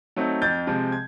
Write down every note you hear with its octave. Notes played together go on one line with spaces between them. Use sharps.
F#3 A3 C4 D#4
F2 G6 A6
C3 F3 G#3 C4
G#6